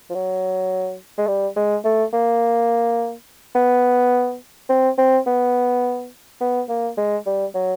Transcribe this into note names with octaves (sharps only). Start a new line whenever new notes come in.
F3
F#3
G#3
G3
G#3
A3
A#3
B3
C4
C4
B3
B3
A#3
G#3
G3
F#3